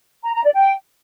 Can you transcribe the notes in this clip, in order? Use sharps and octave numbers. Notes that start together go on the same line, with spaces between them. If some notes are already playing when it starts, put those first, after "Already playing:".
A#5
A#5
D5
G5